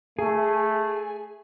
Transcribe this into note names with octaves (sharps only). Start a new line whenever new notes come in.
A3 G#4